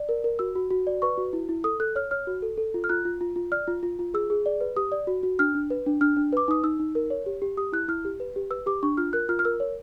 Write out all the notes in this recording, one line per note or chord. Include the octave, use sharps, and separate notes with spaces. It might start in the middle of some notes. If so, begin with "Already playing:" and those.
Already playing: D5
A#4
A#4
F#4 E6
F#4
F#4
D5
B4 C#6
F#4
E4
E4
A4 D#6
A4 F#6
C#5 F6
C#5 F6
F#4
A4
A4
F4
F6
F4 F#6
F4
F4
F4
D5 F6
F4
F4
F4
G#4 E6
G#4
D5
B4
G4 D#6
D5
F#4
F#4
D4 F6
D4
B4
D4
D4 F6
D4
B4 D6
D#4 D#6
D#4 E6
D#4
A#4
C#5
G4
G4
G4 D#6
E4 F#6
E4 F6
G4
B4
G4
B4 E6
G4 D6
D4 C#6
F4 F6
A#4 F#6
F4 F6
F6
A#4 E6
C#5